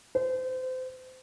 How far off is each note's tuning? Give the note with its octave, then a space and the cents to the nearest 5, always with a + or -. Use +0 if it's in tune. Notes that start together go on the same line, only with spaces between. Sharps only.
C5 -30